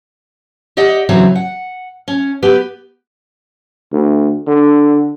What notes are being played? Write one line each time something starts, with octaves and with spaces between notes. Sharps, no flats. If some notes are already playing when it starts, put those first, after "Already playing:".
G4 D5 D#5 F#5
C#3 E3 F#3 C4
F#5
C#4
B3 G4 B4
D2
D3